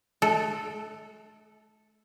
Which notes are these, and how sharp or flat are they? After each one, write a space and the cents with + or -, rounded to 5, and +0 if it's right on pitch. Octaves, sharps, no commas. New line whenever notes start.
A3 -45 A4 +0